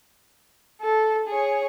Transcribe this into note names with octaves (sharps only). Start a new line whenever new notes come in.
A4
G#4 C#5